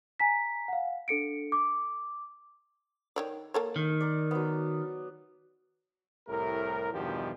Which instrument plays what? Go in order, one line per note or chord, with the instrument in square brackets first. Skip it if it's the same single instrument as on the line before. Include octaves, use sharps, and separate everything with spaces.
[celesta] G#5 A#5 B6
F5 F#5
D4 A4 C#7 D7
D6
[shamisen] D#3 C#5 D5
A#3 A4 C#5
[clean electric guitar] D#3
[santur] A#4 D5
F#3 B3
[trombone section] C2 A2 A3 G4 A#4
E2 G2 B2 D#3 F3 G4